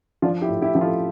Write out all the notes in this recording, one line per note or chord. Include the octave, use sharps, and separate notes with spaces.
F3 D4 F4
E4 G4
A2
E4 G4
F3
F4 A4